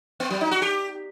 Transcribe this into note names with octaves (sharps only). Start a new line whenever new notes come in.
B3
F#3
D#4
F#4
G4